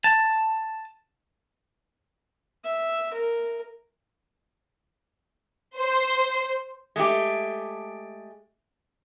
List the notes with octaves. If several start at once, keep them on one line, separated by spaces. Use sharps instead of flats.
A5
E5
A#4
C5
G#3 A3 G4